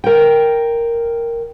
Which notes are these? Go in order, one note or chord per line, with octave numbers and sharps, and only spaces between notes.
A#4 G5